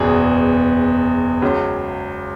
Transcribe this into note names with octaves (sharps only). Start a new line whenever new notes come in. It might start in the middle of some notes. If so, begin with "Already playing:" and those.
Already playing: F#1 E2 B2 G#4
C#2 C#3 F#3